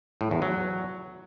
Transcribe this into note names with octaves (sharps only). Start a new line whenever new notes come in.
A2
E2
F#3